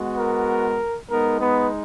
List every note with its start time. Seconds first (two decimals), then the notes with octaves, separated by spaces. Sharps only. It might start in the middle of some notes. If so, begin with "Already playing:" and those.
Already playing: G#3 B3 F#4
0.16 A#4
1.09 G#3 B3 D#4 A#4
1.40 B3 B4